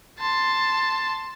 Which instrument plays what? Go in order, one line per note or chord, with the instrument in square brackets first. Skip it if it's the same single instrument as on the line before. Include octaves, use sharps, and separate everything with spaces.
[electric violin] A5 C6